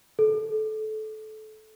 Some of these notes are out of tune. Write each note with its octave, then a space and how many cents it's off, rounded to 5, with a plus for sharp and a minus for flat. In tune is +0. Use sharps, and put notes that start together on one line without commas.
A4 -20